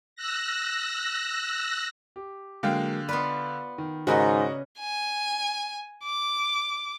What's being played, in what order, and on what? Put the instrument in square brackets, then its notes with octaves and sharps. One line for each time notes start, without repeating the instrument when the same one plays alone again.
[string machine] E6 F#6 A#6
[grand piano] G4
[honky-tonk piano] D3 F5 G5 [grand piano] F#3 G#3 A#3
[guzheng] B3 F4 B4 [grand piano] D5
[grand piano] D#3
[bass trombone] G#2 [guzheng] C#3 B4 D5 [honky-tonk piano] F#4 A#4 D#5
[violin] G#5
D6